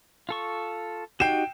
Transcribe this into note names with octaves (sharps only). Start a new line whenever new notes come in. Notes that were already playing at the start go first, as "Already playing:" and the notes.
F4 A4 C#6
D#4 F#4 G4 G5 C7 E7